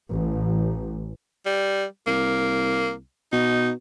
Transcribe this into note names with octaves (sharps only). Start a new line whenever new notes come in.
A1
G3
C2 A#3
B2 D#4